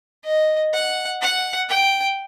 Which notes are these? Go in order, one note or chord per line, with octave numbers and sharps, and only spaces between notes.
D#5
F#5
F#5
G5